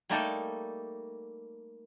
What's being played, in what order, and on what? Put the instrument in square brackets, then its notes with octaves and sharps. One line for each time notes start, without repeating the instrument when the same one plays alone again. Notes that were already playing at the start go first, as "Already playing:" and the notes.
[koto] G3 A3 A#3 D#4 G4 A4